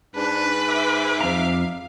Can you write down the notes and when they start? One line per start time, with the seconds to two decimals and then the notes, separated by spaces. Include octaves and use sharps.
0.16 G#2 D4 B4
0.67 E5 D6
1.21 F2 F5 A#5